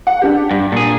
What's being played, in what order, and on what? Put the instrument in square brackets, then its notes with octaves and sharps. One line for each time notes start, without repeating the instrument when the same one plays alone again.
[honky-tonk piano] F#5
D4 G4
[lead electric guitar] G2
A#2 G#4